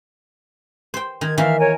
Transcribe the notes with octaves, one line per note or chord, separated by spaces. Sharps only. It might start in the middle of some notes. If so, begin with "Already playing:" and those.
C5 G5
D#3 G#6
D#3 E3 A#3 E5 F5 F6
A#4 C#5 G#5